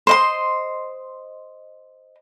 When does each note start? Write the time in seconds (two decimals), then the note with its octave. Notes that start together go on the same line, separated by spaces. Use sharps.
0.07 C5 D#5 C6